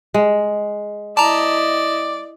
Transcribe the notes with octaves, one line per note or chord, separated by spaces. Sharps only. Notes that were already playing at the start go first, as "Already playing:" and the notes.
G#3
E4 D5 D#5 A5 A#5